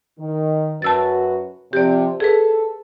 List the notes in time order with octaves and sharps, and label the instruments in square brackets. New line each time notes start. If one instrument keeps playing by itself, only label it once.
[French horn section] D#3
[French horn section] F#2 F#4 B4 [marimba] A5 E6 A6
[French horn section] C3 F3 C4 [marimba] G4 D5
[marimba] G#4 B4 [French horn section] A4